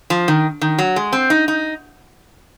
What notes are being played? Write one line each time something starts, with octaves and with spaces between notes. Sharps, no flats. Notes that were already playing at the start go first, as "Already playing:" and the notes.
F3
D#3
D#3
F#3
G#3
C4
D#4
D#4